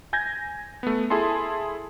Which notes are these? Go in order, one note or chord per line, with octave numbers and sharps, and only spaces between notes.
G#5 G6 G#6 A#6
A3 B3
E4 G#4 A4 A5 C6